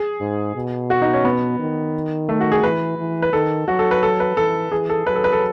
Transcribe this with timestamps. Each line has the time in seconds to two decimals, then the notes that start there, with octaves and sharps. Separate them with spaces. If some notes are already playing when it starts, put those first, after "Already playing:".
Already playing: G#4
0.21 G#2
0.55 B2
0.90 F#4
1.02 D#4
1.13 C#4
1.25 B3
1.59 D#3
2.29 A3
2.40 F#4
2.52 G#4
2.63 E3 B4
2.98 E3
3.22 B4
3.33 D#3 A4
3.68 F#3 F#4
3.79 A4
3.91 B4
4.03 A4
4.20 B4
4.37 E3 A4
4.72 E3 G#4
4.90 A4
5.07 F#3 B4
5.15 A4
5.24 B4
5.33 A4